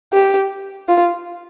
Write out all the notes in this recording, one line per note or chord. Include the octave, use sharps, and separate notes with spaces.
G4
F4